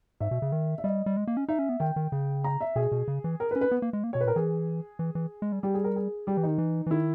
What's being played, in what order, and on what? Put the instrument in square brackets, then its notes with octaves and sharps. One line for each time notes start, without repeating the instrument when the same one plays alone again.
[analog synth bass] G#2 [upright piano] E5
[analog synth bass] B2
C#3
D#3
[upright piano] E5
[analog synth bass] G3 [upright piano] D#5
[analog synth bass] G3
G#3
A#3
C#4
[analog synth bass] D#4 [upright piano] E5
[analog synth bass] C#4
B3
[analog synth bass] D#3 [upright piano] G5
[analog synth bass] D#3
C#3
[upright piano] A#5
E5
[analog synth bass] B2 [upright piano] G#4
[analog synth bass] B2
C#3
E3
[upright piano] A#4
B4
[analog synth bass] C#4
[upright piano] B4
[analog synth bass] B3
A#3
G#3
A#3
[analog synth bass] B2 [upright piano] C#5
[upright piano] B4
[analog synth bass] A#2
[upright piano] A#4
[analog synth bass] E3 [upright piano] G#4
[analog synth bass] E3
E3
G#3
G3
[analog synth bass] G3 [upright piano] G4
[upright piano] G#4
A#4
G#4
[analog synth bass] G3 [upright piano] G4
[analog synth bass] E3
[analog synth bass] D#3 [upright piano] D#4
[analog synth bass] E3
E3
[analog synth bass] D#3 [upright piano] E4